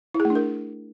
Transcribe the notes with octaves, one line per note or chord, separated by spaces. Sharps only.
E4
G#4
A3
D4
A#4